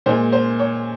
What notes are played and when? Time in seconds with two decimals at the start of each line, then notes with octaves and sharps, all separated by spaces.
0.06 A#2 G#3 C5
0.32 C5
0.59 C#5